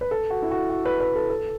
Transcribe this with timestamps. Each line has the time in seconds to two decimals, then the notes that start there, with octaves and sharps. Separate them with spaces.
0.01 B4
0.11 A4
0.30 F#4
0.42 E4
0.51 F#4
0.70 F#4
0.85 B4
1.00 B4
1.15 A4
1.30 A4